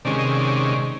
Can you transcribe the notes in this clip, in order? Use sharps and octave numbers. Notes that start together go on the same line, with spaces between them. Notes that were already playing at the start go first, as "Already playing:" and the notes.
C3 D#3 G#3 C#4 D5
D#5
D5